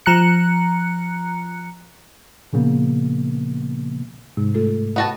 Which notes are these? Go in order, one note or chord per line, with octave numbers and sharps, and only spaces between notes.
F3 A#5 F#6 C#7
A#2 C#3 F3 A#3 B3
G#2 C3
A3 F4 A4
B3 F#4 A5